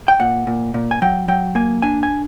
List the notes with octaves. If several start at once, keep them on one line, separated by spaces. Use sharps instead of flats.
G5
A#2 F#5
A#2
A#2
G#5
F#3 G5
F#3 G5
A#3 G#5
D4 G#5
G#5